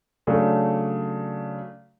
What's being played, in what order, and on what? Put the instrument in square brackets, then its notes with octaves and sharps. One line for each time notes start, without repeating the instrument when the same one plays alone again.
[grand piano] C#3 F#3 A3 D4